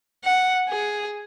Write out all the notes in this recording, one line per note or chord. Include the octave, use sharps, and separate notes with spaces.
F#5
G#4